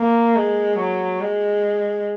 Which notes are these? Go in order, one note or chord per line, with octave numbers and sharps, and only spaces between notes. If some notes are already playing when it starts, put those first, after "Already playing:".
Already playing: A#3
G#3
F#3
G#3